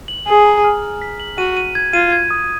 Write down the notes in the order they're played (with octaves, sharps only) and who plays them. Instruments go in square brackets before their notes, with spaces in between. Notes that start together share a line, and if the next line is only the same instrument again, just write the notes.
[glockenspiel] F#7
[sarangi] G#4 [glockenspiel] F#7
[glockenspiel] A#5
F6
F6
B6
F#7
[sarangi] F#4 [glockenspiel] D#7
[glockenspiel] D#7
G#6
[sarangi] F4 [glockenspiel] D#7
[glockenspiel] G#6
D#6